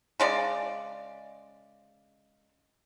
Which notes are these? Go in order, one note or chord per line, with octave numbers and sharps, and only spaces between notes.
C#3 G#3 D5